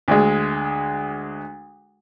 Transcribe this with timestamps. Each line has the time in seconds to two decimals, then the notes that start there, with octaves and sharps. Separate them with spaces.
0.08 D2 G#3